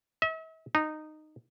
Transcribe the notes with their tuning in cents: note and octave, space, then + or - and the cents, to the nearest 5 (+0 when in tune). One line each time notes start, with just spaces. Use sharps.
E5 -40
D#4 -15